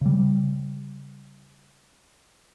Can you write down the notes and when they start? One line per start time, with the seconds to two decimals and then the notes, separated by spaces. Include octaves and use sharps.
0.01 C#3 G3